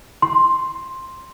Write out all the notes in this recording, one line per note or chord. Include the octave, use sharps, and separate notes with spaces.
C6